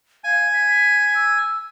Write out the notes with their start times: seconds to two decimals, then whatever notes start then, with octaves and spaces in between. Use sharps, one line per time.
0.24 F5 G#5
0.53 B6
1.15 E6